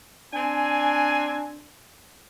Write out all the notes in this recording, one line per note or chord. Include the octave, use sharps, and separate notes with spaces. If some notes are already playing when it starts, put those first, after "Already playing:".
C4 D4 G#5